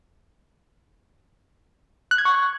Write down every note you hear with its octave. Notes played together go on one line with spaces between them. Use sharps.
F#6
G#6
C#6